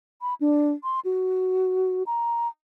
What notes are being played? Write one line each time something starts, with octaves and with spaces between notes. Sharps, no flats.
B5
D4
C6
F#4
A#5